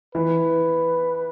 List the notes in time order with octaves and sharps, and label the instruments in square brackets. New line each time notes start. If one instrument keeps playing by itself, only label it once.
[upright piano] E3 [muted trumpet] B4